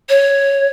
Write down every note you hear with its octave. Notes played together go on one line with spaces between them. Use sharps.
C#5